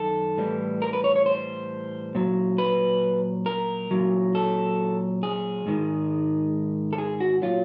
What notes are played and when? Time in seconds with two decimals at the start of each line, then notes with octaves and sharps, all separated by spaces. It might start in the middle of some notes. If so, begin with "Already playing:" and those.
Already playing: F#2 D#3 A4
0.37 A2 E3 G3
0.82 A#4
0.93 B4
1.04 C#5
1.16 C#5
1.26 C5
2.15 A#2 F#3
2.58 B4
3.46 A#4
3.91 A#2 F#3
4.35 A4
5.23 G#4
5.66 G#2 D#3 G#3
6.93 A4
6.98 G#4
7.20 F#4
7.42 A#2 F#3 F4